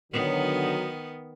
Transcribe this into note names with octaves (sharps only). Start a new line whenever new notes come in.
D3 D#3 F#3 B3